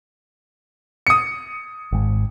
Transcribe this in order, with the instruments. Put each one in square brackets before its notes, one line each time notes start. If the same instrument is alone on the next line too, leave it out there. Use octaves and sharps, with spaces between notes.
[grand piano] D#6 C#7
[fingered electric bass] G#1 G#2